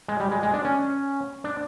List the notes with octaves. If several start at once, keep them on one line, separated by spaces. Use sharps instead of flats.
G#3
G3
G#3
G#3
D4
C#4
D4